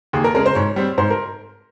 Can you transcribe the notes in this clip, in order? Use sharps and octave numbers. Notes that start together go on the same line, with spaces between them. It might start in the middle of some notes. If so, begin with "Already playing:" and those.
D#2 G#4
A#4
C#3 G#3 A#4
C5
G#2 C#5
G3 C4
G#2 C5
A#4